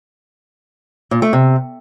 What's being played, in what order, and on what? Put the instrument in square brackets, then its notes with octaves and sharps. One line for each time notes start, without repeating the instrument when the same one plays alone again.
[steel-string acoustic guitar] A#2
A3
C3